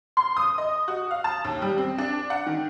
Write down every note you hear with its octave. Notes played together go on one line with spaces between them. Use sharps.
C6
D#6
D#5
F#4
F5
A5
D#2
G3
C4
D4
F#5
D#3